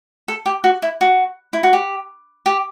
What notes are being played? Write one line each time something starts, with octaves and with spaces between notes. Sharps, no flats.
A4
G4
F#4
E4
F#4
E4
F#4
G4
G4